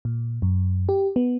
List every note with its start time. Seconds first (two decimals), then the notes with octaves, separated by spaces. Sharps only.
0.05 A#2
0.42 F#2
0.89 G4
1.16 B3